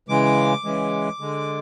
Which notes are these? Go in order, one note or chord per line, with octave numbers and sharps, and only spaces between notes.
C#3 E3 G#3 D6
C#3 E3 G#3
D3 G#3